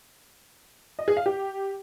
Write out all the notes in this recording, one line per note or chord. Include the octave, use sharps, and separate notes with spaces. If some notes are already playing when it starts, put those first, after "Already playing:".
D#5
G#4
F5
G4